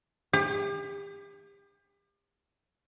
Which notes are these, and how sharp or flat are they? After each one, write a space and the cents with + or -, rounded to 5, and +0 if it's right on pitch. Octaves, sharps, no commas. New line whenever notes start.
G4 +35